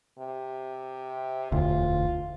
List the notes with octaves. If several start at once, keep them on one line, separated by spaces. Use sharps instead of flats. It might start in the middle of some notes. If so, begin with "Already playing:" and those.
C3
E1 D2 F4